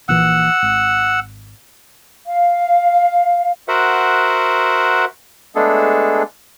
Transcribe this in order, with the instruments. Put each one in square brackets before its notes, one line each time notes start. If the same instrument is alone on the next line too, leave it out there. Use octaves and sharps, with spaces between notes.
[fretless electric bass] A#1 A#2 E3 [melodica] F#5 E6
[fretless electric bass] G#1
[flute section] F5
[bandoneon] F#4 A#4 C5 E5 F#5
G#3 A3 B3 D4 G#4 A4